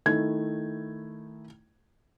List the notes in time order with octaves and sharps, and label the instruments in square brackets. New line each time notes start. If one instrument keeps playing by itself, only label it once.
[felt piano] D#3 A3 E4 G#6